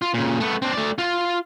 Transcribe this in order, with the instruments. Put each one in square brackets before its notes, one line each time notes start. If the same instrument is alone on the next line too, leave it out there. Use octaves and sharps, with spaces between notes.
[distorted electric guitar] F4
A#2 C#3
A3 B3
C4 D4
A3 D5
F4